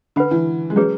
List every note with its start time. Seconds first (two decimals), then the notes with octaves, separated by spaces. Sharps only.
0.16 D3 B4 F#5 B5
0.31 E3
0.70 G#3
0.76 F#3 C#4 G#4 B4